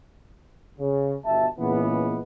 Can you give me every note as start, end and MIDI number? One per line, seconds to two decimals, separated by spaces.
0.79 1.16 49
1.25 1.47 31
1.25 1.47 47
1.25 1.47 76
1.25 1.47 81
1.59 2.19 46
1.59 2.19 49
1.59 2.19 52
1.59 2.19 56
1.59 2.19 59